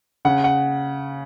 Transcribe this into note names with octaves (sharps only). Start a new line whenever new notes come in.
C#3 F#5
F#5